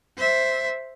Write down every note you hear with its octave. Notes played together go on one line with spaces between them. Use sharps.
C5 E5